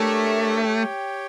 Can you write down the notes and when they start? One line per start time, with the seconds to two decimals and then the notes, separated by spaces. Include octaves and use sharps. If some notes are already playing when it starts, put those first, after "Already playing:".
Already playing: A3 D4 G4 A#4 C#5 E5
0.63 G4 C#5 G5